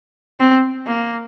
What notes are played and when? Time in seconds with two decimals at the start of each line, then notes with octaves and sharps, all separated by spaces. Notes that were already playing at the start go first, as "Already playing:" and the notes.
0.40 C4
0.86 A#3